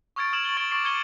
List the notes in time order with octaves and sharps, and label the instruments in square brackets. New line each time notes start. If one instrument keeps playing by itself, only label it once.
[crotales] C#6 D#6 F6 G#6 A6 D7
D#6 F6 G#6 D7 E7 F#7
D7 F#7 G7
C#6 A6 D7 F#7 G7
C#6 D6 A6 C7 D7 F#7
C#6 G#6 C#7 D#7 G7